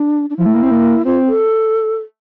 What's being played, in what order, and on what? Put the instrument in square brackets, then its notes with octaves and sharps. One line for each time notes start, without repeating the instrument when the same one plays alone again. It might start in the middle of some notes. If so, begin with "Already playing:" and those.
Already playing: [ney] D4
D4
[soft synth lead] F3 [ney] E4
[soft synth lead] A3
A#3
C4
A#3
[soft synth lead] C4 [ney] F4
[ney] A4